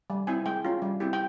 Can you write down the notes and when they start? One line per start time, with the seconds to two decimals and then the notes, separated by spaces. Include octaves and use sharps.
0.10 G3
0.27 C4 E4 G#5
0.46 G#3 G5
0.65 C#4 F4
0.82 G3
1.00 C4 E4 G4
1.13 G5